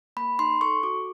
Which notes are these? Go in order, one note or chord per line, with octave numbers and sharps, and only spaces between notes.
A#3 B5
D#4 C6
A4 C#6
F#4 D6